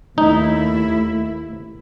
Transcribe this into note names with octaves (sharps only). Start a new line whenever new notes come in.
D#2 A3 D#4 E4